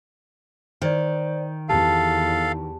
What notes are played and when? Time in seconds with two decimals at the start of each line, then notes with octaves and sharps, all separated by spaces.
0.82 D#3 C5 D5
1.69 E2 G4 A4 F5 A5